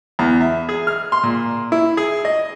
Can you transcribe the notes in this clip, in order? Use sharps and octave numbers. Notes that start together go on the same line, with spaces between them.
E2
E5
G#4
F6
C6
A#2
E4
G#4
D#5